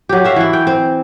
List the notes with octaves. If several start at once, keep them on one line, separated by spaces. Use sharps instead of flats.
F#3 G4
F#4 E5 F5
E3 E4
G5
C4